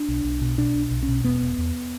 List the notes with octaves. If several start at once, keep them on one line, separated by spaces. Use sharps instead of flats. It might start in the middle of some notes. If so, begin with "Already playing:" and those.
Already playing: D4
B1
B1
B2
B2 D4
B1
B1
C#4
B2
E1 B3
E1
E2